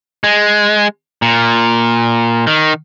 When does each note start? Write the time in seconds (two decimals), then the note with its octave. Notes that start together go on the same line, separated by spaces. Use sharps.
0.24 G#3
1.22 A#2
2.47 D#3